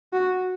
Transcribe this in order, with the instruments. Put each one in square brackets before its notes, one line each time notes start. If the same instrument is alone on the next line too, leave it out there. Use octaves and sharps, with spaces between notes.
[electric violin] F#4